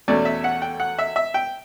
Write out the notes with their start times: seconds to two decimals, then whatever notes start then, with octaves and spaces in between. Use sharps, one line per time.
0.08 E2 B2 A3 C#4 D5
0.25 E5
0.44 F#5
0.62 G5
0.80 F#5
0.99 E5
1.16 E5
1.34 G5